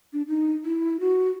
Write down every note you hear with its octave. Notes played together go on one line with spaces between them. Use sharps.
D4
D#4
E4
F#4